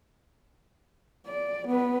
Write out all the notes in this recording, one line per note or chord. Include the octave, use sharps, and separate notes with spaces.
D5
B3 B4